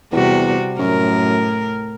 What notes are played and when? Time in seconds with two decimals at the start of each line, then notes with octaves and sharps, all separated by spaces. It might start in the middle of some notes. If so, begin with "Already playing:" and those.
0.12 E2 C3 G3 F#4
0.79 F#2 A2 A#4